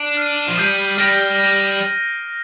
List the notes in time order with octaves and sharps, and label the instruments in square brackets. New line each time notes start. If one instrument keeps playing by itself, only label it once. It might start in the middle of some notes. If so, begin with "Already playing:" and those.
Already playing: [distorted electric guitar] D4
[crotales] F6 C7 D#7
[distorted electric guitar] F3
[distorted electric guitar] G3 [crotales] D#6 G6 C7 D#7
[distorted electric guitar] G3 [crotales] F6 A#6 D7